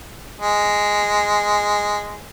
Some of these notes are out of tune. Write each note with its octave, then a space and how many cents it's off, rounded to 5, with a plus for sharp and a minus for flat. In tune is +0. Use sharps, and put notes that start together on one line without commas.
G#3 -5